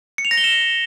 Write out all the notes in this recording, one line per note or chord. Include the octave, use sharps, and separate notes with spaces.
C#7
F7
A#6
G7
E7